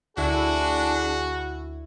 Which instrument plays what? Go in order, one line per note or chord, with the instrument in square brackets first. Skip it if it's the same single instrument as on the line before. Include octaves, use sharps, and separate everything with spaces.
[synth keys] D2 E4 [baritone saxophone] D4 [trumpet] F#4 [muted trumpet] G#4